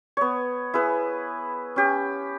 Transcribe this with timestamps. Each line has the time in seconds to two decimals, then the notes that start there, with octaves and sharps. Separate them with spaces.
0.17 B3 C#5
0.74 E4 G#4 B4
1.76 C#4 G4